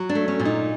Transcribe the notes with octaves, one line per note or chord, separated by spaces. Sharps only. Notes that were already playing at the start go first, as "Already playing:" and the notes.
Already playing: F#3
D4
A3
C#4
A#2
D#4